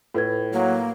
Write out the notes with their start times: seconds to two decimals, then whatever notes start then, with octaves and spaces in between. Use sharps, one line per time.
0.14 A2 F4 B4 G#6
0.53 F#3 A#3